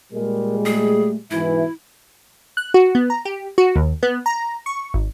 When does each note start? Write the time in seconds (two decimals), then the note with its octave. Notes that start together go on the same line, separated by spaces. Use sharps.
0.12 A#2 G3 G#3 A#4
0.66 A3 G#4
1.31 G#2 B2 E3 E4 E5
2.57 F#6
2.74 F#4
2.95 B3
3.10 A#5
3.25 G4
3.58 F#4
3.76 D#2
4.03 B3
4.26 A#5
4.66 C#6
4.94 G#1